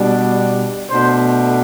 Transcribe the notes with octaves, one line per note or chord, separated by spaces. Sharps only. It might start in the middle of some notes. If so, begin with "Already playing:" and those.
Already playing: B2 G3 D4
B2 A3 D4 C5